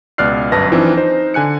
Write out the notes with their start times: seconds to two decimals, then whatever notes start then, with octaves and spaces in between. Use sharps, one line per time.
0.18 C#2 B2 D5 F6 F#6 C7
0.52 G1 F#2 B4 A5 A#6
0.72 E3 F3 C4 D4 D#4
0.97 D#4 C5
1.34 D3 G#5 F#6 C#7